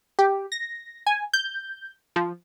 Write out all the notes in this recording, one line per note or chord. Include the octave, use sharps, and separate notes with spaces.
G4
A#6
G#5
G6
F3